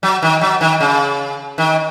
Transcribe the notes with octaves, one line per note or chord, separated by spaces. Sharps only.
F#3
D#3
F#3
D#3
C#3
D#3